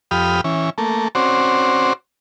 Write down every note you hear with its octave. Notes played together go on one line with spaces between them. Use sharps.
F2 G4 B5 D#6 F6
E3 C#4
A3 A#3
C4 C#4 F#4 C5 D5